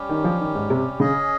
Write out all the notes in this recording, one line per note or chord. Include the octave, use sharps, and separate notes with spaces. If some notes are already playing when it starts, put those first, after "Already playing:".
Already playing: G3 C#4 G4
D#3
F3
D#3
G#2
C3
C#3 C#4 G#4 D#5